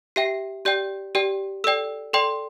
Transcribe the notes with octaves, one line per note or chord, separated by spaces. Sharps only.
G4 E5 G5 C7
G4 D5 G5 G6
G4 D5 G5
A4 D5 G5 E6
A4 D5 G5 C6